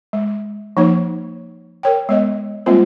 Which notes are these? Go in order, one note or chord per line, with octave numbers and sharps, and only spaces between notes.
G#3
F3 A#3 D#4 C#5
A#4 C#5 G5
G#3 B3 C#5 D#5
G3 G#3 A#3 C4 F4 C5